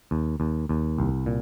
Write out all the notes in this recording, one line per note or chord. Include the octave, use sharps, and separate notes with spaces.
D#2
D#2
D#2
C2
A#2